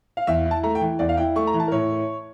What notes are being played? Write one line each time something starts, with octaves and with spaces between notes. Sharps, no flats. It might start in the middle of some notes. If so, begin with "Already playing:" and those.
F5
E2 E5
E4
A5
A3 A#5
G5
E3
E2 D5
F5
E4 G5
A3 C#6
A#5
E3
A5
A#4
A2 C#5